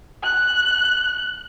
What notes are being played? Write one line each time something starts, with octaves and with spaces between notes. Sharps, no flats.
F#6